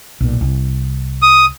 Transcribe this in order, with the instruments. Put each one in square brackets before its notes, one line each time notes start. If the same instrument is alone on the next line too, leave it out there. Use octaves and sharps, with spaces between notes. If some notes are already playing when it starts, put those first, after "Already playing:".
[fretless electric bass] B1 A#2
C2
[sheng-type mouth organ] D#6